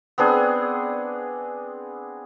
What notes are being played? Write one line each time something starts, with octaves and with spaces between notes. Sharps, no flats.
B3 C4 D4 G#4